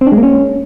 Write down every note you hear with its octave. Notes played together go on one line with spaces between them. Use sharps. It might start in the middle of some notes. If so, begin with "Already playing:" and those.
C4
D4
G#3
A#3
C#4